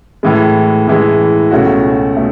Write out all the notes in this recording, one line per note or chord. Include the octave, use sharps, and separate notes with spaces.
A2 E3 G#3
A2 E3 G#3
C#2 B2 A3 C#4 F#4
B2 A3